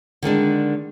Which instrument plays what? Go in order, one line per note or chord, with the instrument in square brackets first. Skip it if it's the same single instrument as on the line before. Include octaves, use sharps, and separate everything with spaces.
[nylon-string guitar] D3 D#3 G#3 D4